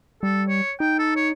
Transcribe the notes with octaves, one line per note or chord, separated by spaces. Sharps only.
G3 A4
C#5
D#4 G5
A4
C#5